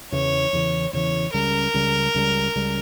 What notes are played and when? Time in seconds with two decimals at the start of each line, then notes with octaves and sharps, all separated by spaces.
0.12 E2 C#3 E3 C#5
0.53 E2 C#3 E3
0.93 E2 C#3 E3 C#5
1.34 C#2 C#3 G3 A#4
1.74 C#2 C#3 G3
2.14 C#2 C#3 G3
2.55 C#2 C#3 G3